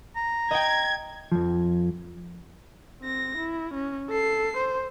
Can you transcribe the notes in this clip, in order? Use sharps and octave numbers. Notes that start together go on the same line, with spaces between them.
A#5
D#5 G5 G#6
F2 F3
C4 A#6
E4
C#4
A4 C7
C5